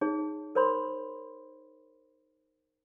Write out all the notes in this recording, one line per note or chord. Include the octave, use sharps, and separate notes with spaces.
D#4 G#4 C#5
A#4 C5 C#5 B5 C6